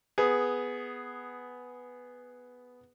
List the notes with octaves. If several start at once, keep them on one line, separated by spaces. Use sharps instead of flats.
B3 G#4